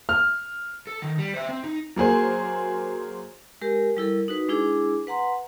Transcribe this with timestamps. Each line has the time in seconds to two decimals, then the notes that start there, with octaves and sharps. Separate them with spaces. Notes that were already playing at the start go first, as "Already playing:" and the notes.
0.09 F6
0.87 A4
1.02 D#3
1.18 G3
1.34 C5 E5
1.49 C4
1.64 D#4
1.96 F#3 A#3 G#4 C5
3.61 G#3 G4 A#4
3.97 G3 E4 A4 A#4
4.28 D#4 F#4 B4
4.48 G#3 D4 E4 G#4 D6
5.07 B4 F#5 A#5 C6